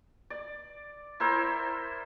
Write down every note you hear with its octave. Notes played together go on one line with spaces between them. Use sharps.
D5
E4 A#4 C5 E6